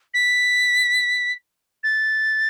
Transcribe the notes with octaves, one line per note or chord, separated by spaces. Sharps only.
B6
A6